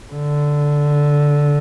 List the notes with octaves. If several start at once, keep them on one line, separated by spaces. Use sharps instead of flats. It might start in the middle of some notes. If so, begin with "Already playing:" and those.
D3